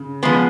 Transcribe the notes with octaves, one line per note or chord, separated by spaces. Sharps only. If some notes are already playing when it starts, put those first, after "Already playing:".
Already playing: C#3
F3 G#3 B3